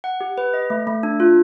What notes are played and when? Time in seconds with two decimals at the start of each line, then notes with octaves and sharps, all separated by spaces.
0.04 F#5
0.21 G4
0.38 B4
0.54 D#5
0.70 A3
0.87 A3
1.03 D4
1.20 F4